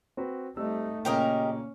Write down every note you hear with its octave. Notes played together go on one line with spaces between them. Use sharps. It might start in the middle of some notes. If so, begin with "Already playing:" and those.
C4 F#4 B4
G3 A3 C4 D#4 E6
A#2 C#3 A#3 C#4 G4 A#4 D#5